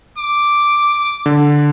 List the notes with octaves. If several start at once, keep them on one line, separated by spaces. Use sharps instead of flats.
D6
D3